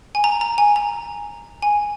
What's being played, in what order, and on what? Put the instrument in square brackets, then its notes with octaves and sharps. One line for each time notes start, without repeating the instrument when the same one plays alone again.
[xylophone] G#5
A#5
A#5
G#5
A#5
G#5